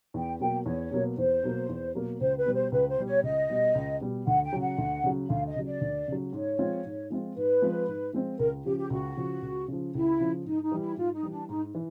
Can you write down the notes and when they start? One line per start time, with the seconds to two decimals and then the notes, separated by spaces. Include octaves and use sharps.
0.14 E2 G5
0.40 B2 F#3 A#3 G5
0.66 E2 C#5
0.91 B2 F#3 A#3
1.17 E2 C5
1.43 B2 F#3 A#3
1.69 E2
1.95 B2 F#3 A#3
2.20 C#2 C5
2.38 B4
2.46 B2 G3
2.54 C5
2.72 C#2 B4
2.89 C5
2.98 B2 G3
3.07 C#5
3.23 C#2 D#5
3.50 B2 G3
3.75 C#2
4.01 B2 G3
4.27 D2 F#5
4.44 G5
4.53 C#3 F#3
4.61 F#5
4.78 D2
5.04 C#3 F#3
5.30 D2 F5
5.47 D#5
5.56 C#3 F#3
5.65 D5
5.81 D2
6.08 C#3 F#3
6.33 G#2 C#5
6.59 F3 G#3 C4 F4
6.85 G#2
7.10 F3 G#3 C4 F4
7.36 G#2 B4
7.62 F3 G#3 C4 F4
7.88 G#2
8.13 F3 G#3 C4 F4
8.39 C#2 A#4
8.65 C#3 F3 G4
8.77 G4
8.90 C#2 F#4
9.17 C#3 F3
9.42 C#2
9.68 C#3 F3
9.94 C#2 E4
10.20 C#3 F3
10.45 G#2 D#4
10.63 D#4
10.72 E3 G3
10.80 E4
10.97 G#2 F4
11.14 D#4
11.23 E3 G3
11.31 D4
11.49 G#2 D#4
11.75 E3